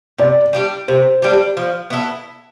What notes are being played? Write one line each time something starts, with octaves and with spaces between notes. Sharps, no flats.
C3 D5
G3 D4 G4
C3 C5
G3 D4 G4
F3
B3 E4 A4